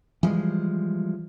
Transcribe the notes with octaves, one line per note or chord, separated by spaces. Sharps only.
E3 F3 G3 G#3